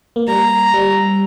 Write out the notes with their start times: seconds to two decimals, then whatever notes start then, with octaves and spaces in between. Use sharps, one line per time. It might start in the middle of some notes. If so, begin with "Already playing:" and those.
0.16 A#3
0.27 G3 A#5
0.74 G3